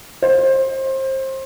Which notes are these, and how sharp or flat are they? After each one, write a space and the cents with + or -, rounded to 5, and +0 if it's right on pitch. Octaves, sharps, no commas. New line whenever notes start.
C5 +25